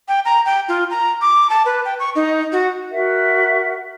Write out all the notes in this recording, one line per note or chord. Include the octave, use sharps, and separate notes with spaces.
G5
A#5
G5
F4
A#5
D6
A5
B4
G5
C#6
D#4
F#4
F#4 A#4 E5 F#5